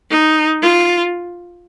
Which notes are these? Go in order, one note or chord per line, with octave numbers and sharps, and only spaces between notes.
D#4
F4